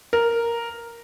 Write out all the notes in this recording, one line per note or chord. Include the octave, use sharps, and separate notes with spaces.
A#4